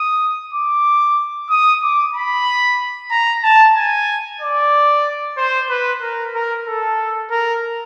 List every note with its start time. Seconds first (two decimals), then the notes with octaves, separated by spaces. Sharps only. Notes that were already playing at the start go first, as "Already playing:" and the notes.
Already playing: D#6
0.53 D6
1.50 D#6
1.82 D6
2.15 B5
3.11 A#5
3.43 A5
3.76 G#5
4.41 D5
5.38 C5
5.70 B4
6.02 A#4
6.35 A#4
6.67 A4
7.31 A#4